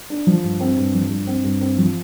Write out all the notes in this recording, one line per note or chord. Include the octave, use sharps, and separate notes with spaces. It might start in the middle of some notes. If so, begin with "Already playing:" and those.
D4
F3
G2
C4
G2
F3
G2
C4
G2
C4
F3